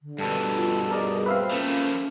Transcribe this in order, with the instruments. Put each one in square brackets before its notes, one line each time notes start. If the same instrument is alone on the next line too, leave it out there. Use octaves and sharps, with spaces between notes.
[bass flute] D3
[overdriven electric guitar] G2 B2 [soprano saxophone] A4
[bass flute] F4
[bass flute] G#4 [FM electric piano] A#4 D5 D#5
[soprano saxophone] C4 [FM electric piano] B4 E5 F5
[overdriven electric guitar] F3 A3 [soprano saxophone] A#3 [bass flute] C#4